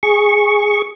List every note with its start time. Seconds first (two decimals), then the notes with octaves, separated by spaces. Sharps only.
0.03 G#4 C#6